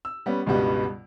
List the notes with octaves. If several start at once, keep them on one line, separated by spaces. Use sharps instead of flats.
E6
G3 B3 C#4
C#2 G2 B2 G3 B3